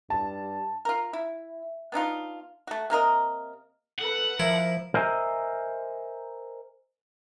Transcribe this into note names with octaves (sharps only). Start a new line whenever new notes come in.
G2 A5
F4 A#4
E4
B3 D4 D#4 F4
A3 F#4
C3 A#3 A#4 D#5
A4 B4 F#5
F3 E4 A#4
A#4 C5 D#5 E5 G#5 A#5